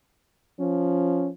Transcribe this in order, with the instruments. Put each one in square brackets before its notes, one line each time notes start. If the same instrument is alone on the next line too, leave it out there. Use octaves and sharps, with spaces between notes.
[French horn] F3 [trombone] C#4